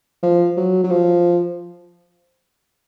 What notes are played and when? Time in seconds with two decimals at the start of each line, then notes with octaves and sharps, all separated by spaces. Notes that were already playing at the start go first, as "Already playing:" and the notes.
0.23 F3
0.57 F#3
0.84 F#3
0.91 F3